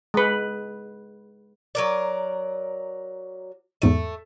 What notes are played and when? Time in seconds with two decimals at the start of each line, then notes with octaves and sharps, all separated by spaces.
0.14 G#3 B4
1.75 F#3 A#4 D5
3.82 E2 G#2 A3 D#7